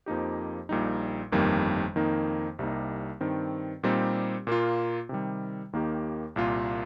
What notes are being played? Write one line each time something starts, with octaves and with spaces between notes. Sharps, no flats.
F2 F3 A#3 D#4 G4
A#1 A#2 G3 D#4
G1 F2 D#3 G3 A#3
F2 D#3 A#3 D#4
C2 C3 G3 A#3 D#4
G2 D#3 C4
A#2 G3 C4 D#4 G4
A#2 A#3 F4
C3 D#3 G3
D#2 D#3 A#3 D#4 G4
C2 A#2 A#3 F4